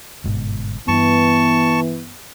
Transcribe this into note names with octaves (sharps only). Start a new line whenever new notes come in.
G1 G#2 B2
G2 E3 B3 A5 C#6